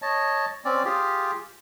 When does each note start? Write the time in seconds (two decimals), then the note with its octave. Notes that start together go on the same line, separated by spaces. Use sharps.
0.02 C#5 D#5 A5
0.65 C4 C#4 D5
0.85 F4 G4 G#4